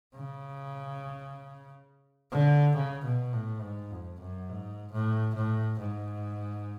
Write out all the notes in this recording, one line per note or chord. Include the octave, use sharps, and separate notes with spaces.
C#3
D3
C#3
B2
A2
G#2
F2
F#2
G#2
A2
A2
G#2